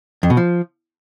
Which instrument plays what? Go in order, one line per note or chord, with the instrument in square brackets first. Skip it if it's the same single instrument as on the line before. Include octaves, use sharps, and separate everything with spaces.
[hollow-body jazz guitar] F2
B2
F3